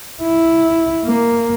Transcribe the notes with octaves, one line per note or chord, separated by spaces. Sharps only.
E4
A#3